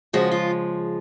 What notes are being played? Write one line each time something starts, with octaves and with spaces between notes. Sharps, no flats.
C#3 F3 G#3 F#4
F4